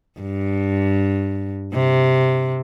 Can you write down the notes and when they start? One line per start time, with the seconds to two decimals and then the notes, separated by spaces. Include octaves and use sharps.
0.20 G2
1.74 C3